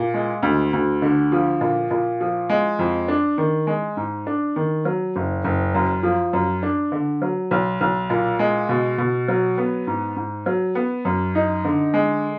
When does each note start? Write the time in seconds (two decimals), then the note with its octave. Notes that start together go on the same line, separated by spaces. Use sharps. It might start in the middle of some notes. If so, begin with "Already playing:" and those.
Already playing: A#2
0.14 G#3
0.43 D2
0.73 D2
1.02 D3
1.32 F3
1.61 A#2
1.91 A#2
2.21 F3
2.50 G#3
2.79 F2
3.08 D4
3.38 D#3
3.67 G#3
3.97 G#2
4.27 D4
4.56 D#3
4.85 F#3
5.16 F#1
5.44 F#1
5.75 F#2
6.03 F3
6.33 F#2
6.63 D4
6.92 D3
7.22 F#3
7.51 B1
7.81 B1
8.10 A#2
8.39 G#3
8.69 B2
8.98 B2
9.28 F#3
9.58 B3
9.87 G#2
10.16 G#2
10.46 F#3
10.75 B3
11.05 F#2
11.35 D#4
11.65 D3
11.94 G#3